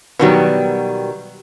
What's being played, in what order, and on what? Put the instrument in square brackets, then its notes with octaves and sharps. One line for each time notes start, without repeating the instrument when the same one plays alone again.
[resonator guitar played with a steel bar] B2 D#3 G3 [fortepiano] F#3 B3